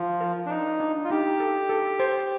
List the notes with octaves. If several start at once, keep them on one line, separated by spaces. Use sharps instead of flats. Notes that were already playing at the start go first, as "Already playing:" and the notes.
Already playing: F3
A#4
D4
D#4 D5
D4
F4
D#4 G4
A4
A4
C5